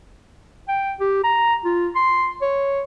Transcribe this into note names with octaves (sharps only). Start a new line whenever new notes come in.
G5
G4
A#5
F4
C6
C#5